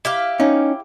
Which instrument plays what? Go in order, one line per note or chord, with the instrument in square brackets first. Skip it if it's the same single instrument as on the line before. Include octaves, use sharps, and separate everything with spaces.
[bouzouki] E4 G4 F5
[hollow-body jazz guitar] C#4 D#4